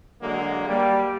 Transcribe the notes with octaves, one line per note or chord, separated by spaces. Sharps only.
D3 F#3 G#3 A#3
G3 A#3